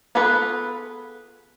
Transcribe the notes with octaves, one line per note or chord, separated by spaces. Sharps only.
B3 F4 G#4 A4 B4